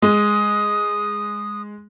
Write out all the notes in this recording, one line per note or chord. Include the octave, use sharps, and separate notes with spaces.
G#3 D#6